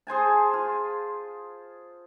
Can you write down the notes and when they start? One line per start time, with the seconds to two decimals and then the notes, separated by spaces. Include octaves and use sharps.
0.07 G#4 C5 G#5 A5
0.53 F4